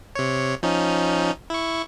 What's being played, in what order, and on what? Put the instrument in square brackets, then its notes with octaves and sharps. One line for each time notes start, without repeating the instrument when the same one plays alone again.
[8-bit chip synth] C3 C#5
F3 C#4 D#4
E4 C#6